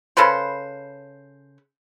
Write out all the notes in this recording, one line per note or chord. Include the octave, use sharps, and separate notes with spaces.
C#3 A4 B4 C5